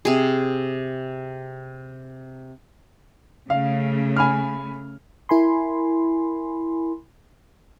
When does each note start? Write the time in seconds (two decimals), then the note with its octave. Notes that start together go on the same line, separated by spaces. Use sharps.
0.05 C3 G#4
3.50 C#3 A3 F5
4.17 G#5 B5 F6
5.29 E4 A#4 G#5 B5 C6